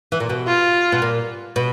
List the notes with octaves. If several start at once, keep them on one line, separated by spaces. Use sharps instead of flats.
E3
A#2
B2
F4
B2
A#2
B2